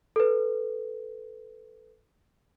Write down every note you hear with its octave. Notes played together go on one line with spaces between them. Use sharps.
A4 B4